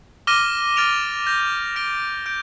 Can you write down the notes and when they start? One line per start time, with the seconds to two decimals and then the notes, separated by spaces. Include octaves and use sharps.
0.27 D6 F6 A#6 D#7 G7
0.77 F6 A6 D7 F7
1.27 G6 A#6 F7
1.76 F6 A#6 D7 G7
2.26 G6 D7